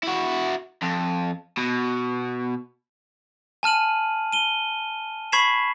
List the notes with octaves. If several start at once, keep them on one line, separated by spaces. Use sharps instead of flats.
E4 F#4
F2
B2
G#5 A5 F6 D#7 F#7
D#7 G7
B5 C#6 G#6 B6 C7 E7